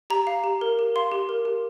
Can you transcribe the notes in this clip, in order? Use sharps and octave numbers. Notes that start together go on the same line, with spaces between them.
G4 A#5
F5
G4
A#4
G4
F5 C6
G4
A#4
G4